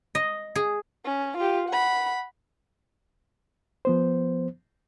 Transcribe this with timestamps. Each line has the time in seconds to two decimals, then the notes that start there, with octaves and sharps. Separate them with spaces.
0.15 D#5
0.55 G#4
1.06 C#4
1.38 F4 G4
1.69 F#5 B5
3.85 F3 B3 C5